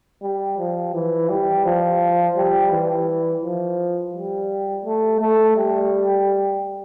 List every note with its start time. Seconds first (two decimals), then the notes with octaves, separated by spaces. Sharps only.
0.23 G3
0.59 F3
0.95 E3
1.30 G3
1.65 F3
2.37 G3
2.71 E3
3.43 F3
4.14 G3
4.85 A3
5.20 A3
5.57 G3